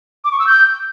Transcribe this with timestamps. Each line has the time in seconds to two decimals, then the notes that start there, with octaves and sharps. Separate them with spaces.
0.24 D6
0.32 C#6
0.39 E6
0.47 G6